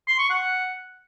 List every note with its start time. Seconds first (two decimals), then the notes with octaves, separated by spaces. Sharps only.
0.08 C6
0.19 C#6
0.30 F#5